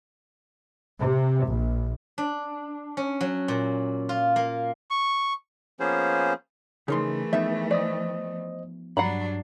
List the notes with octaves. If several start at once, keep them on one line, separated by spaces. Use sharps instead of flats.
C3
A#1
D4
C#4
F#3
A#2
F4
A#3
C#6
F3 A#3 B3 C#4 G#4 C5
C#3 E3 A3 D#4 G#4 A#4 C6
F3 B3 D#4 E5
C5 D5 D#5 D#6
G2 F#3 D4 F#5 A#5 B5 C7